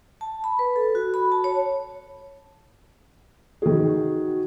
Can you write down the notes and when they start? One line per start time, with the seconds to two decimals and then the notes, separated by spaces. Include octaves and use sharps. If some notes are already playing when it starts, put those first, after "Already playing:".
0.21 A5
0.44 B5
0.59 B4
0.76 A4
0.95 F#4
1.14 B5
1.32 A5
1.44 C#5
3.62 D#3 F#4 G#4